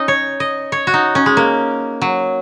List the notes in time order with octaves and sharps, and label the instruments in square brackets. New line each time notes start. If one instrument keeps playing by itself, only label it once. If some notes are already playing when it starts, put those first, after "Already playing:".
Already playing: [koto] C#4 D#4 D#5
C#5
D#5
C#5
F#4
D#4
C#4
G#3
A#3
F#3